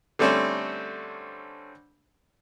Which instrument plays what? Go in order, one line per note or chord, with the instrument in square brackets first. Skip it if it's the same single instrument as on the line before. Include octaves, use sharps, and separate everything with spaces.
[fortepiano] D3 G3 A3 C4 C#4 C5